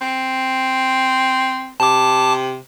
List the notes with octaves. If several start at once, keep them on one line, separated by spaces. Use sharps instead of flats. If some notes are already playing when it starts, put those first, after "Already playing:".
C4
C3 A5 D6